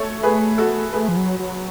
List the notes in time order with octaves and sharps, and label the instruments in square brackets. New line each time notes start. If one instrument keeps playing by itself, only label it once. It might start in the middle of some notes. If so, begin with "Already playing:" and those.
Already playing: [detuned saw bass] A3 [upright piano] A4 C#5
[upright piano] G#4 B4
F#4 A4
[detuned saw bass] A3 [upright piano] G#4 B4
[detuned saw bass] F3
F#3
F#3